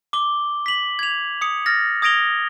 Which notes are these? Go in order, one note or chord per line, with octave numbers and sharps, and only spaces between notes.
D6 G7
B6 F#7
G#6 F7
D#6 C#7
F6 A6 A#6
D#6 G#6 A#6 D7 F7 G7